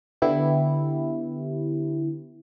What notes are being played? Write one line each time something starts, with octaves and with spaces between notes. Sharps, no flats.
D3 B3 E4 G4